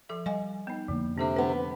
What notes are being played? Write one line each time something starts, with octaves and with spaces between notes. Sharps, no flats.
F3 A4 E5
G3 D#5 F5 G#5
B3 D#4
F2 D3 F3 A#3
C3 D4 A4 E5
B3 D4 B4